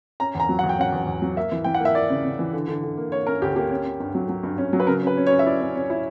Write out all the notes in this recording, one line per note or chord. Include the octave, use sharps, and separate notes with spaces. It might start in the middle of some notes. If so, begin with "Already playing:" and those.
C#4 A#5
E2 A#5
F#3
E2 F#5
G5
C#4 F#5
E2
E2
F#3
A#3 E5
E3
E3 G5
F#5
A#3 E5
A#3 D5
C#3
C#3
E3
D3
D3
D3
A#3
A#3 C#5
C#4 A#4
D2 G4
A#3 G4
C#4
C#4
G2
F#3
F#3
G2
C#4
F#3
B4
C#3 A#4
C#4 B4
C#4
C#5
C#4
E5
E4 D5
C#4
C#4
E4